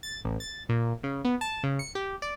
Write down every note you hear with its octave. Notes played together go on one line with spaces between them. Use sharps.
A6
A1
A6
A#2
C#3
B3
A5
C#3
C#7
G4
D5